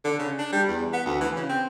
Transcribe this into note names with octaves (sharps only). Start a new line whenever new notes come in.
D3
C#3
D4
G3
E2
B3
D2
E3
C#3
C4